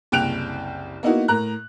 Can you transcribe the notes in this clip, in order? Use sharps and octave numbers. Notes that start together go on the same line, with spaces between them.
F#1 C2 G5 F#6 D7 F7
A#3 B3 D#4 E4 F#4
A2 A#4 A#5 F#6